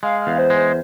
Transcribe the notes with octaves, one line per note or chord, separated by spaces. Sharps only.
G#3 F5
F5
E2
C5
G#3
C5